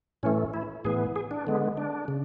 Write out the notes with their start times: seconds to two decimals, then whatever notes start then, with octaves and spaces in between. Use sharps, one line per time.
0.23 A2 E3 A3 C#4
0.54 E4
0.85 A2 E3 B3 G#4
1.16 G#4
1.31 D4
1.47 D3 G#3 B3
1.77 D4
2.08 C#3